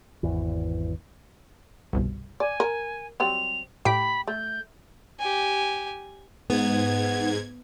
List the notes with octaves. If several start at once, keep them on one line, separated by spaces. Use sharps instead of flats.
G#1 E2 E3
G1 C2 B2
D5 G#5
A#4
F#3 G3 C4 F7
A2 G4 B5 B6 D7
A3 G6
G4 G#5
G#2 B3 G#6